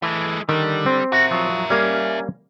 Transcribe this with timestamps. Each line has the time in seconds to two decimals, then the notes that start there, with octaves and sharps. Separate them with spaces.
0.02 E3 G#3 A3
0.49 D3 D#3 G3
0.86 C4
1.12 F#4 A#4 E5
1.31 F3 F#3
1.70 G3 A#3 C#4 F5